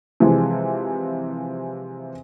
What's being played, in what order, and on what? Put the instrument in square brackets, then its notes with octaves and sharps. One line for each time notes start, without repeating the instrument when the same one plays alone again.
[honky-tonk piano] C3 E3 F3 G#3